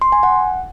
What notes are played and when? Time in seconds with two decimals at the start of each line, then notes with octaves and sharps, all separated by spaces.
0.02 C6
0.12 G#5
0.23 F#5